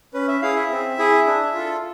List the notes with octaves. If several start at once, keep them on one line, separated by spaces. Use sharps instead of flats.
C#4 B4
E5
E4 G#4 F5
E5
C4
E4 G#4
D4
F4 A4